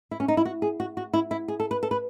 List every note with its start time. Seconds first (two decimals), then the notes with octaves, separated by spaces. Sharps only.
0.11 E4
0.20 C#4
0.28 D#4
0.37 E4
0.45 F#4
0.62 G#4
0.80 F#4
0.97 F#4
1.13 E4
1.31 E4
1.48 G#4
1.60 A4
1.71 B4
1.83 A4
1.91 B4